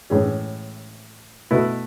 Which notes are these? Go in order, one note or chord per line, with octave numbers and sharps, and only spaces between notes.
A2 E3 G#3 C#4 G#4
B2 A3 E4 B4 D#5